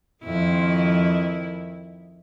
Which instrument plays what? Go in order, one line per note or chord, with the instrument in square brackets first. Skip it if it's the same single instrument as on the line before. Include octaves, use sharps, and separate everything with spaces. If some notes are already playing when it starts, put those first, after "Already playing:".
[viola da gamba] F2 D#3 E4